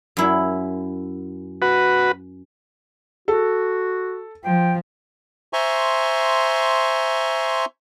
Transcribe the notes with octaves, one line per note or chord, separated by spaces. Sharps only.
F#2 E4
F#4 B4
F#4 A4
F3 G5
C5 E5 G#5 A#5 C6 C#6